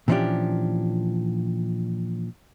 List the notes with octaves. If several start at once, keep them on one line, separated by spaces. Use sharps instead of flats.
A#2 E3 F3 C#4 D4 G4